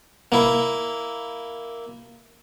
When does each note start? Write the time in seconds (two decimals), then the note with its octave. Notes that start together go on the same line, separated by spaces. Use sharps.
0.32 A#3 E4